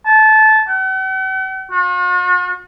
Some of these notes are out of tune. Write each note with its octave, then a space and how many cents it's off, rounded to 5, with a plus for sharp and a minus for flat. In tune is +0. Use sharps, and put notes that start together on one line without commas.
A5 -20
F#5 +45
F#4 -45